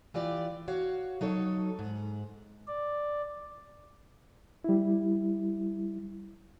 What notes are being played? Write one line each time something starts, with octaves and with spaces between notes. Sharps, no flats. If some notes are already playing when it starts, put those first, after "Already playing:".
E3 F4 G4 D5
F#4 C#5 F5
F#3 D#4 A4 C#5
G#2
D5
G3 E4